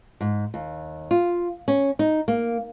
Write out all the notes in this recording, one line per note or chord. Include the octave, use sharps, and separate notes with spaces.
G#2
D#2
F4
C#4
D#4
A#3